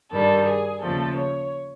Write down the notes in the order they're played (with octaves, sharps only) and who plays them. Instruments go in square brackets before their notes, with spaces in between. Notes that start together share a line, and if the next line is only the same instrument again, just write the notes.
[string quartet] G2 D#3 G3 A4
G#4
D#2 C#3 F3 A3 A4
C#5